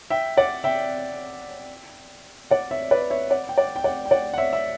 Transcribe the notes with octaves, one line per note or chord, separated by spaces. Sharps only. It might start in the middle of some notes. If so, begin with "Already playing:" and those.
E5 G5
D5 F#5
E5 G5
D5 F#5
C#5 E5
B4 D5
C#5 E5
D5 F#5
G5
D5 F#5
G5
D5 F#5
G5
D5 F#5
F#5
C#5 E5
E5